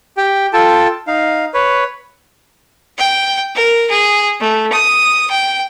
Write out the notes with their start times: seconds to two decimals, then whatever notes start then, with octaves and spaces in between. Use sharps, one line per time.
0.17 G4 G5
0.53 F4 A4 G5 A5
1.07 D#4 F5
1.54 B4 C#5
2.97 G5
3.55 A#4
3.90 G#4
4.41 A3
4.72 D#6
5.30 G5